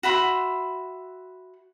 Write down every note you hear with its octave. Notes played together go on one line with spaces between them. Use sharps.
F#4 E5 B5 C6